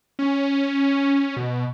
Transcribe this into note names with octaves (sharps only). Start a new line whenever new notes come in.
C#4
B2